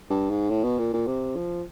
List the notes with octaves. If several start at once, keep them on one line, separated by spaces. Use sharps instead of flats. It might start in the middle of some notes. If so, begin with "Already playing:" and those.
G2
G#2
A2
B2
A#2
A#2
C3
F3